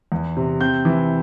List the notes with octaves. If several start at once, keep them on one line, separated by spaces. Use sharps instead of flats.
E2
C3
C4 G6
E3